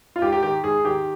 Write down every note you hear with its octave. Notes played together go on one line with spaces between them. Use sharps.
F4
G#2 G4
G4
D#3 G4
G#2 G#4
D#3 G4